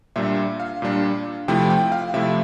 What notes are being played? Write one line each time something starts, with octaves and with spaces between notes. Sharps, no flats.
A#2 G3 D4 E5
F5
A#2 G3 D4
C3 F3 A3 E4 G5
G5
F5
C3 F3 A3 E4 E5